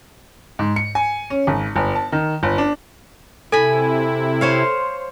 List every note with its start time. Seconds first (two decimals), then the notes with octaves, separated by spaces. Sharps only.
0.59 G#2
0.76 C#7
0.95 G#5
1.30 C#4
1.47 G#1
1.76 G1
1.95 A5
2.12 D#3
2.43 G1
2.58 D4
3.52 C3 E4 A4 G#5 B5
4.41 C5 C#5 F5